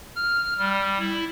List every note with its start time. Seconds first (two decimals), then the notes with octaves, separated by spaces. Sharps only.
0.16 F6
0.58 G3
0.99 E4